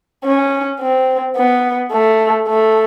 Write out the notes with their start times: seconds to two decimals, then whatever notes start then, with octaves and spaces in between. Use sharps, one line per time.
0.25 C#4
0.80 C4
1.37 B3
1.92 A3
2.48 A3